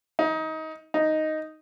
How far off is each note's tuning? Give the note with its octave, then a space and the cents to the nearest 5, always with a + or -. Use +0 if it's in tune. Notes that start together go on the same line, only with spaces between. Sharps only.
D#4 +25
D#4 +0